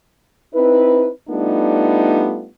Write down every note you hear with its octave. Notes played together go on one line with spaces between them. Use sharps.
C4 D#4 E4 B4
G3 A3 B3 D4 D#4 F4